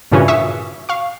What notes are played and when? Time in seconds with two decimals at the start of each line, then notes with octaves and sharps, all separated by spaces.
0.12 G2 A#2 C#3 E3 C#4 F#4
0.28 E5 C#6 D#6 E6 B6
0.89 F5 C#6